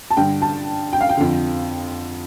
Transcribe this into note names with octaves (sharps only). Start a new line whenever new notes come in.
A5
G2 D3 G5
A5
G5
F5
G5
F2 D3